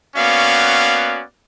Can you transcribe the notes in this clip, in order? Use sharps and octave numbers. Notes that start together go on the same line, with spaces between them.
A#3 B3 C#4 F#4 D5 F5